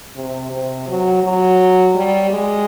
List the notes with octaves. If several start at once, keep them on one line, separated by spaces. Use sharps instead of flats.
C3
C3
F#3
F#3
G3
G#3